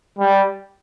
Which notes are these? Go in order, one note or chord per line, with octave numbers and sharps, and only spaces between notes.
G3